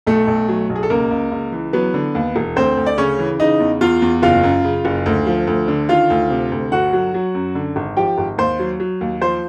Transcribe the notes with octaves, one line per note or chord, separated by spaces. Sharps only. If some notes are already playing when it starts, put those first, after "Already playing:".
B1 A3 A4
B1
F#3
B1
G#4
A4
C#2 A#3 A#4
C#2
C#2
E3
F#3 B3 B4
D3
D#2
E1
D2 C4 C5
D2
D5
C#3 C#4 C#5
E3
C#3 D#4 D#5
E2
E2 F4 F5
E2
F#1 F4 F5
F#2
C#3
F#1
D2
F3
D2
D3
D#3 F4 F5
D2
C3
D2
G1 F#4 F#5
F#3
F#3
F#2
D3
G#1
F3 G4 G5
G#1
D#2 C5 C6
F#3
F#3
D#2
F3 C5 C6